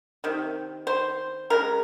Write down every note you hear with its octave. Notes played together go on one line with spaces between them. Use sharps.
C3 D#3
C5
C#3 G#3 A#4